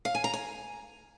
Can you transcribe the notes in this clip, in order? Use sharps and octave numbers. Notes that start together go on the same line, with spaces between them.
F5
G#5
A#5
G#5